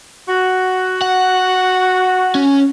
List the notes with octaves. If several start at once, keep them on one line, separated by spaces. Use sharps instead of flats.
F#4
F#5
C#4